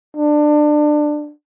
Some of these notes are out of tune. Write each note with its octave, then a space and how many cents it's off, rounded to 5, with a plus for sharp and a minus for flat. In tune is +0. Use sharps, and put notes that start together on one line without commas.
D4 +20